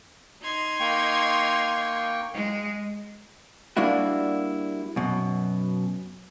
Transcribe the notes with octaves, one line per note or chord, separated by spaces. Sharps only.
D#4 C6 G#6
A#3 G5 C#6
G#3
G3 A#3 D4 E4 F#4
F#2 B2